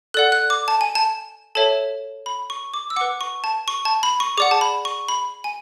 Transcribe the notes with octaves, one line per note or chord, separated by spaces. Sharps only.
A4 D5 F#5 F#6
F#6
D6
A5
G#5
A5
A4 C#5 E5 A5
B5
C#6
D6
E6
B4 F#5 D6
C#6
A5
C#6
A5
B5
C#6
G#4 D5 F#5 D6
A5
B5
C#6
B5
G#5